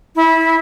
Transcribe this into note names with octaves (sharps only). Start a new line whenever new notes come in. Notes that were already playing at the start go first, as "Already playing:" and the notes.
E4